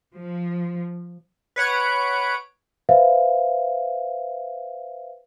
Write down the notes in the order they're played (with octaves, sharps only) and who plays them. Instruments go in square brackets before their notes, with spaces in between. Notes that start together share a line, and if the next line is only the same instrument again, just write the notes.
[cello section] F3
[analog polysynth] B4 C#5 F#5 D7
[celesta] B4 C5 E5 F5